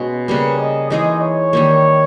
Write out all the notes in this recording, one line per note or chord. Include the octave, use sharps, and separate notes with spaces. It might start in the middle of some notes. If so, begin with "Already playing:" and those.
Already playing: B2 G#3 C#4
C#3 G3 A#3 B4
D#5
E3 G#3 D#4 G#4 D#5
C#5
D#3 G3 A#3